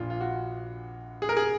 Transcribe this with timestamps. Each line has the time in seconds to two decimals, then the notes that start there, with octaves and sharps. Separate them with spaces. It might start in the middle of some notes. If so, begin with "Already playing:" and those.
Already playing: A#1 A#2 F3 F4
0.10 F4
0.21 F#4
1.22 G#4
1.29 A#4
1.37 G#4